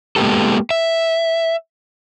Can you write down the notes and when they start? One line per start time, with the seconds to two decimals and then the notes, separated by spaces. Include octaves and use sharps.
0.16 G#3 A#3 B3 G4 A4
0.71 E5